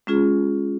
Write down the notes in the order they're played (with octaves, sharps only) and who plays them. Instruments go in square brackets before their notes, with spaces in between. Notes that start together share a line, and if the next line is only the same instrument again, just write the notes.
[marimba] G#3 C#4 F4 G#4